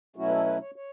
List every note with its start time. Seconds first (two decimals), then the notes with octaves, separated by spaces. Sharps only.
0.16 B2 F#3 A3 C#4 E4 F#4
0.28 B4
0.32 A4
0.46 B4
0.60 C#5
0.76 C#5